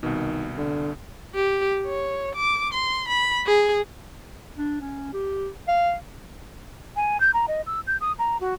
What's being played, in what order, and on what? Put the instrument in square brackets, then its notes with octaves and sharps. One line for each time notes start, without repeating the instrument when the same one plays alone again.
[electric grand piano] C2 B2 [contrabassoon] D#3
[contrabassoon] D3
[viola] G4
C#5
D6
C6
B5
G#4
[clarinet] D4
C#4
G4
F5
[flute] G#5
G6
A#5
D#5
E6
G6
D#6
A#5
F#4